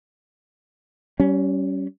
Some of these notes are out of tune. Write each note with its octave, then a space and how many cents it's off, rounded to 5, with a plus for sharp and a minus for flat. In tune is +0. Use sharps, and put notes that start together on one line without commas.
G3 -30 C#4 +10